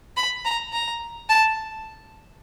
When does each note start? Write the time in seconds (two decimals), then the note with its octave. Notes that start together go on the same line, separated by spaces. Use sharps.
0.17 B5
0.45 A#5
0.73 A#5
1.29 A5